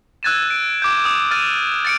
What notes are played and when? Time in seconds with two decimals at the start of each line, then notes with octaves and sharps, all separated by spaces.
0.23 E6 F#6 G#6 A6 D#7 E7
0.50 D7
0.82 D6 G6
1.05 D#6
1.31 F6 A6 D#7
1.85 A6 C#7 D7